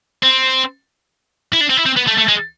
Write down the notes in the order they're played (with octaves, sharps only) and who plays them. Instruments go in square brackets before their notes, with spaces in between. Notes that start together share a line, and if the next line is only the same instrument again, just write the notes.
[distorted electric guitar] C4
E4
D4
C4
E4
C4
B3
A3
A3
G#3